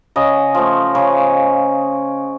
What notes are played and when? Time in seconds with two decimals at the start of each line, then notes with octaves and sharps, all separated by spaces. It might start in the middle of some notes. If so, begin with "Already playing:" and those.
0.16 C#3 D#5
0.55 F3 A3
0.95 C#3